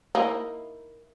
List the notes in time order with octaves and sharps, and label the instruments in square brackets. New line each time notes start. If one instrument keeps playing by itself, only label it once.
[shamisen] A#3 D#4 E4